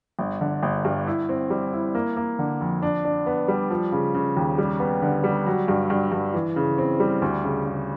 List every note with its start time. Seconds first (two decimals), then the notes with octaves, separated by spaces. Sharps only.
0.19 G1
0.41 D3
0.63 G1
0.85 G2
1.07 E4
1.29 C4
1.50 G3
1.73 E4
1.95 A#3
2.17 A#3
2.39 D3
2.61 F2
2.82 D4
3.05 D4
3.26 B3
3.48 G3
3.70 F3
3.92 C#3
4.14 C#3
4.37 D#2
4.58 G3
4.80 B3
5.02 D3
5.24 G3
5.46 F#3
5.68 G2
5.90 G2
6.12 G2
6.34 E3
6.56 C#3
6.78 C4
7.00 G3
7.22 D2
7.44 C#3
7.66 C#3